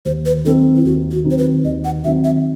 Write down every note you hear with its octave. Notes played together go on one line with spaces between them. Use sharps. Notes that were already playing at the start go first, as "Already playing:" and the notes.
D#2 C5
B4
D#3 F#3 C4 D#4 A4
E4
D#2 F#4
F#4
D#3 F#3 C4 D#4
C5
B4
D#2 D#5
F#5
D#3 F#3 C4 D#4 E5
E5